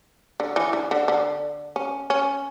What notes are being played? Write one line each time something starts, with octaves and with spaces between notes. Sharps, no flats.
D3
E3
D3
D3
D3
C#4
C#4